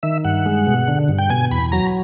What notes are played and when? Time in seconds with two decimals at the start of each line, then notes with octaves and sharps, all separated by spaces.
0.03 D#3 E5
0.25 G2 F#5
0.46 G#3
0.67 B2
0.88 D3
1.09 G2
1.18 G5
1.30 B2 G#5
1.51 E2 B5
1.72 F#3 A#5